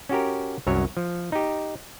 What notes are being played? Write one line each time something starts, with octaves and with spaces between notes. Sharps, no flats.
C#4 F#4 G4 A#4
C2 F#2 F#3 C#5
F3
D#4 G4